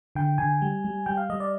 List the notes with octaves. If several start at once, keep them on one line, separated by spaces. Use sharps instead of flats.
D3 G5
D3 G#5
G3
G3
G3 G5
F5
G3 D#5
D5